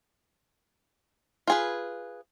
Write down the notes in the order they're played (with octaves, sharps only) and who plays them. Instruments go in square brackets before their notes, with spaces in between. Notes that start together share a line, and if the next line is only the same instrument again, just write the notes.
[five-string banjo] F4 G#4 B4